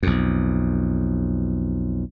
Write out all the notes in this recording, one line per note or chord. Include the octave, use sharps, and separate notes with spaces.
B1 F2